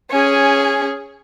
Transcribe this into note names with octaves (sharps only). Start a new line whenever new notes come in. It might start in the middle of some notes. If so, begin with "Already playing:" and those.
C#4 G#4